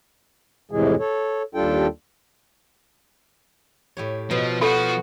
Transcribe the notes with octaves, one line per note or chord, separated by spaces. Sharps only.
F2 A2 C3 E3 G#3 G#4
A4 C#5
D#2 G3 D4 F4 A4 G5
A2 G4 C#5
B2 F3
F3 F4 F#4 A4